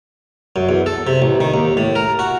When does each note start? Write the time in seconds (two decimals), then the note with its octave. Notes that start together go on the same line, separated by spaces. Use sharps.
0.56 F#2
0.69 E2
0.86 A4
1.07 C3
1.22 A1
1.41 D#3
1.54 D#2
1.77 A2
1.96 A#4
2.19 F#4